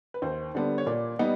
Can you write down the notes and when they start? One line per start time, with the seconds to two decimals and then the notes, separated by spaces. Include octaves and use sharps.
0.14 B4
0.22 D#2 C5
0.55 D3 G3 B3 D4
0.78 C#5
0.86 A#2 D5
1.19 G3 B3 D#4